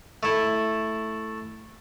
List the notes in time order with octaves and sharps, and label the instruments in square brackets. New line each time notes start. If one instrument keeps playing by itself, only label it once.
[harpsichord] A3 E4